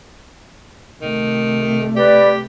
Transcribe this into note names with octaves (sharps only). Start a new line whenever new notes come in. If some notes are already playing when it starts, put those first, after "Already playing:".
C3 D#3 A3
G4 B4 D5